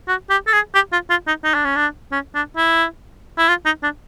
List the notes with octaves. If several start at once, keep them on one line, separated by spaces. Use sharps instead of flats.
F#4
G4
A4
G#4
G4
F4
F4
D#4
D#4
D4
C#4
D4
C#4
D4
E4
E4
F4
D#4
D4